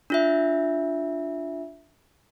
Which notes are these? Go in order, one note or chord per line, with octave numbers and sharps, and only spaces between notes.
D4 F4 E5